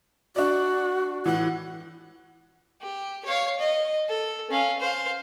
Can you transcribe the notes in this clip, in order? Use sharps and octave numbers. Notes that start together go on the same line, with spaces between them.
D4 F#4 D5
A2 E3 F#5
G4
C#5 F5
D#5
A4
C#4 F5
C5 F5